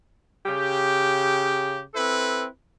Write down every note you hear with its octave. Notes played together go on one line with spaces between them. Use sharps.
C#3 G4
C4 E4 A4 B4